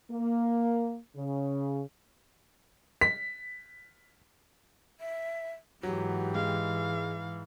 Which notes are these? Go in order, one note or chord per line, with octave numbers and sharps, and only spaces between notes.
A#3
C#3
B6
E5
G#2 E3 F#3 G4
G#3 F5